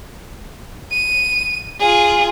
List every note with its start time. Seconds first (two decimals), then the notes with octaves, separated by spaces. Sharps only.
0.92 D#7
1.80 F4 G#4